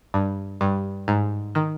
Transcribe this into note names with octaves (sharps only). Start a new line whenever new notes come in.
G2
G2
G#2
D#3